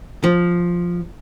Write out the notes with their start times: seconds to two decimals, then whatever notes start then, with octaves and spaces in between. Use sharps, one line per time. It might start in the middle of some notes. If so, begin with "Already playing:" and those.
0.24 F3